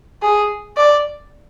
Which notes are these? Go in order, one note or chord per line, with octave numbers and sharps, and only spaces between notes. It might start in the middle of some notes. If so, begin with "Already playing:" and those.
G#4
D5